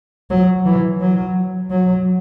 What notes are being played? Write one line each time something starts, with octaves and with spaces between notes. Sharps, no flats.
F#3
E3
F#3
F#3